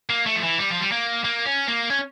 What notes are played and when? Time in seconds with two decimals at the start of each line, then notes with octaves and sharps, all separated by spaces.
0.10 A#3
0.26 A3
0.36 F3
0.43 E3
0.59 G3
0.70 F3
0.80 G3
0.92 A#3
1.25 A#3
1.46 C#4
1.68 A#3
1.90 C#4